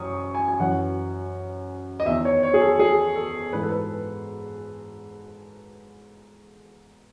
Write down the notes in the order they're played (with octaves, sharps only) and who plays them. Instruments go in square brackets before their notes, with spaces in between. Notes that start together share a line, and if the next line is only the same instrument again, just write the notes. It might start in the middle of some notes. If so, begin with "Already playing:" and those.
Already playing: [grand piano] F#2 C#6 D#6
G#5
G#5
F#2 E3 F#5
D#5
E2 D#3 E5
C#5
C#5
G#4
A4
G#4
A4
G#2 E3 B4
A4
B4